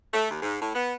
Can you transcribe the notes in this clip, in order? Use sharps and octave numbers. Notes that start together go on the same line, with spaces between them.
A3
D#2
G#2
A2
B3